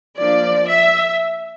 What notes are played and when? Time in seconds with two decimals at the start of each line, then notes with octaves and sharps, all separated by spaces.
0.19 F3 A#3 D4 D5
0.68 E5